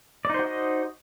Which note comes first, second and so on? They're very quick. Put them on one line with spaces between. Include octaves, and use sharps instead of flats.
D5 D#4 C5 F#4 D#5